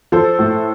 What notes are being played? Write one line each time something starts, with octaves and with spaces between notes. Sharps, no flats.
F3 A4 C5
A2